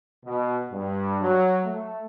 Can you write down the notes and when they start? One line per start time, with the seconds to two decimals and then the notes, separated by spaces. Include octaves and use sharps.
0.25 B2
0.70 G2
1.21 F#3
1.64 A3